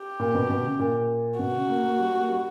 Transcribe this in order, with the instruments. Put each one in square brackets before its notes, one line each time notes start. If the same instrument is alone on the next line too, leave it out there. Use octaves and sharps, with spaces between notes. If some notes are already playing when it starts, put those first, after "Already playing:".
Already playing: [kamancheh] G4
[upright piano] A#2
B2
B2
C#3
A#2
[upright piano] B2 [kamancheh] F#4
[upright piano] C#3
A#3
A#3
G3
A#3
G3